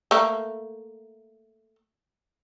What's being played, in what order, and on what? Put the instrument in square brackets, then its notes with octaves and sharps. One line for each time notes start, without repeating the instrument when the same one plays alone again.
[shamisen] A3 A#3